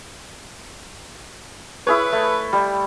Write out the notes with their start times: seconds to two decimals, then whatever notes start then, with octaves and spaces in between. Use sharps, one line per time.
1.87 E4 G#4 B4 C#5
2.13 A3
2.53 G3